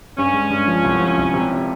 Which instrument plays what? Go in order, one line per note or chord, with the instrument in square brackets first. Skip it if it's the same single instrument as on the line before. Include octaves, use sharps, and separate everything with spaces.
[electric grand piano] G2 [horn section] C#4
[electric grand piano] G#3
G2
F3
C2
F3
C2
C3